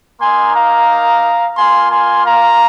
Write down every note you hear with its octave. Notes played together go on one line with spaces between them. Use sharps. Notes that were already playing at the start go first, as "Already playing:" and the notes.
A#3 D#4 G#5 C6
F5 A#5
A#3 F4 G#5 C6
G#5 C6
F5 A#5